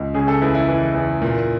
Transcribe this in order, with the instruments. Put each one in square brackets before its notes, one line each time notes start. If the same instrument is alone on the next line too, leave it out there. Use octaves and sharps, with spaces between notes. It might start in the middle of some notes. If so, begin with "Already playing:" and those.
Already playing: [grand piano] C#2
C#3 G#4
A4
E2 E4
E4
E3
E2
A#2